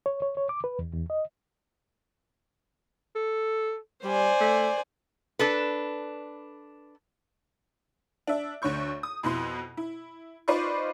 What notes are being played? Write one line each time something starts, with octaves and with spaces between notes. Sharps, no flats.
C#5
C#5
C#5
D6
B4
E2
E2
D#5
A4
G3 C5 D5 G#5
A3
D4 A4 B4
D4 E5
D2 D3 C#5 C#6 G6
D#6
F2 B2 E4 C6
E4
D#4 F4 B4 C5 D5 C#6